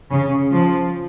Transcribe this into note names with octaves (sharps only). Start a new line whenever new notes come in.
C#3
F3